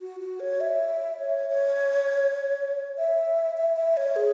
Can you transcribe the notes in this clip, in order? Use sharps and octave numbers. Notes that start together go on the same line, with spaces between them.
F#4
F#4
C#5
E5
C#5
C#5
E5
E5
E5
C#5
G#4